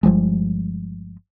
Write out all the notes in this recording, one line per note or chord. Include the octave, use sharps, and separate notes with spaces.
G1 F3 G3 G#3